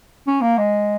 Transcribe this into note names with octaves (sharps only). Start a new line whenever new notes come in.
C#4
A#3
G#3